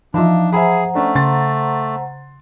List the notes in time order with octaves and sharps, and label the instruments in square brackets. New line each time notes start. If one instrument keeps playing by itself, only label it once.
[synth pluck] E3 F3 [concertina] D4 [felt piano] D#4 E5 [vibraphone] F5
[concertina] G#4 [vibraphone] C5 F#5 A#5 [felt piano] E5 G#5 B5
[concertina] A3 [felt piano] C#4 D4
[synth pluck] C#3 [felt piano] C6 A6